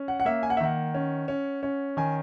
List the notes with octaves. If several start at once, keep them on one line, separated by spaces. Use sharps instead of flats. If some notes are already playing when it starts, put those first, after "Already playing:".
Already playing: C#4
F#5
F#5
A#3 E5
G#5
F#5
E5
D#3 F#5
C#4
C#4
C#4
D#3 G#5